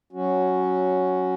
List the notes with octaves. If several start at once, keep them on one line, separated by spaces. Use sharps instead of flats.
F#3 C#4 F#4